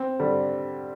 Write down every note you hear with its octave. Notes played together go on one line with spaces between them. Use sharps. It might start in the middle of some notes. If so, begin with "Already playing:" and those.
Already playing: C4
D3 G3